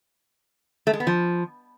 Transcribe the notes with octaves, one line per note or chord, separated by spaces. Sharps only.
A3
G#3
B3
F3